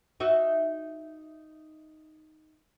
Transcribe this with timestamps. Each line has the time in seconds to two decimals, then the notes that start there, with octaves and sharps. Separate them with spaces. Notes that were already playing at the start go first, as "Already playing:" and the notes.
0.20 D#4 F#4 E5